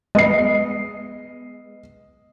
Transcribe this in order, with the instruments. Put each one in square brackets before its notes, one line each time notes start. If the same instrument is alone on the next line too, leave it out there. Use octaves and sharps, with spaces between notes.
[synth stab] G#3 B3 [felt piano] D#5 C7